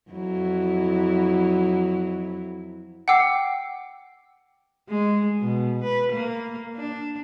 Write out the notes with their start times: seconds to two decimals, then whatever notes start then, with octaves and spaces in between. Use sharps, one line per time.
0.11 F2 F#3 E4
3.08 F#5 G5 D6 E6 C7
4.89 G#3
5.41 B2
5.84 B4
6.13 A#3
6.76 D4